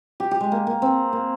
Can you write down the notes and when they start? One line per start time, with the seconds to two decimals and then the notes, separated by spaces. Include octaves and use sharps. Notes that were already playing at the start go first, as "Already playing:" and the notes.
0.20 G4
0.31 G4
0.40 G#3
0.52 A#3
0.67 A#3
0.82 C4
1.13 A#3